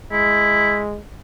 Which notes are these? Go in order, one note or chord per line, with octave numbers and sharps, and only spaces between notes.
G#3 E4